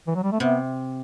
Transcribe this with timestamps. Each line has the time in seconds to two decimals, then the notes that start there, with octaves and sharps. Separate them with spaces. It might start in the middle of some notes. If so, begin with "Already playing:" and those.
0.07 E3
0.15 F#3
0.23 G3
0.32 A3
0.40 C3 B3